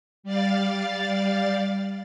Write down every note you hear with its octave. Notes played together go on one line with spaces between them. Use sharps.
G3 D5 F5 A6